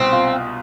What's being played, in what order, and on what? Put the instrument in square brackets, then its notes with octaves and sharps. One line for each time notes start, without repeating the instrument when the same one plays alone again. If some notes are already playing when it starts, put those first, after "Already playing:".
Already playing: [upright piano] C2 B2 B3 [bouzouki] C4
[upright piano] F4